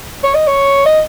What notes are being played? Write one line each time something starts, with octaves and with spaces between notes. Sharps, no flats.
C#5
D#5
C#5
D#5